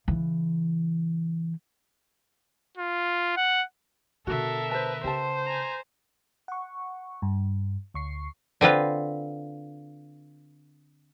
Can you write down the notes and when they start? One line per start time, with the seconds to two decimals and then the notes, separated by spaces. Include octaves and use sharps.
0.08 C#3 E3
2.78 F4
3.37 F#5
4.27 B2 D3 F#4 A4 A#4 E5
4.71 B4 C5 A5
5.04 C#3 G4 C5 A5
5.46 G#5 A#5
6.48 F#5 C#6
7.22 G2
7.94 D2 C#6 C7
8.61 D3 C4 F4 B4